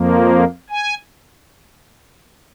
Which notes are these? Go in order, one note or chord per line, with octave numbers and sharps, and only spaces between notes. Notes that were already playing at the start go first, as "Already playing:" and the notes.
Already playing: F2 F3 A#3
G#5